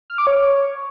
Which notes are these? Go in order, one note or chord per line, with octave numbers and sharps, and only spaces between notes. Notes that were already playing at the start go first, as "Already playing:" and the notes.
F6
D6
C#5